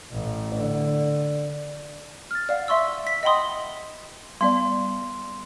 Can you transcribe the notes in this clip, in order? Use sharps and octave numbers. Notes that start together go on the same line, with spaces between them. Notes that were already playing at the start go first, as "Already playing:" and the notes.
A1
D3
F6 A6
D5 F5 F#5
E5 C6 C#6 E6
E6 B6
D#5 F#5 G5 B5 C6 D#6
G3 B3 D5 C6